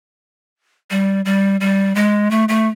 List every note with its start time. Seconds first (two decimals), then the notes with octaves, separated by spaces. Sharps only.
0.91 G3
1.25 G3
1.61 G3
1.95 G#3
2.31 A3
2.49 A3